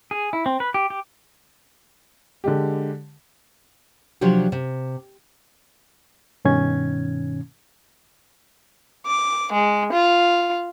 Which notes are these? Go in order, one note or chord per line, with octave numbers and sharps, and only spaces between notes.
G#4
E4
C4
B4
G4
G4
D3 G#3 G4
C3 F3 F#3 D4 G4
C3
G2 B2 D#3 C#4 G#6
D6
G#3
F4